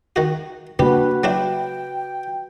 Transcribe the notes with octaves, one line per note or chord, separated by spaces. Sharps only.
D#3 F#4
C#3 G3 A#3 D4 F#4 G4 B4
F#3 D4 E4 G5